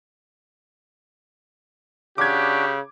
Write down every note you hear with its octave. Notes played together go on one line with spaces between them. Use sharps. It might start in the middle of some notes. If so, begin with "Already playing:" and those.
C#3 D4 F#4 G4 D6 G#6